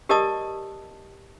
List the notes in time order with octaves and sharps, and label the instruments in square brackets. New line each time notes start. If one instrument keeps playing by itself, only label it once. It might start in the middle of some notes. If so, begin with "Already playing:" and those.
[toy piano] G4 A#4 D5 D#5 A5 D#6